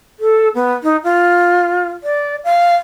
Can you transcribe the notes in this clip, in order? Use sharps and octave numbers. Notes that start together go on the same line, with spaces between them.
A4
B3
D#4
F4
D5
F5